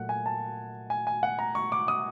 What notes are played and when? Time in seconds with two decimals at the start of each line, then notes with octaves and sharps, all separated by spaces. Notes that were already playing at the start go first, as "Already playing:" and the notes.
Already playing: A#2 F#3 A3 F#5
0.09 G#5
0.26 A5
0.90 G#5
1.07 G#5
1.23 F#5
1.39 A#5
1.55 C#6
1.72 D6
1.88 D#6